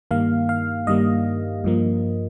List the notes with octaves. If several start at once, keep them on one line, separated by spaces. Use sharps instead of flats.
G2 D#3 G3 A#3 F5
F5
G2 D#3 G3 A#3 D#5
G2 F3 A#3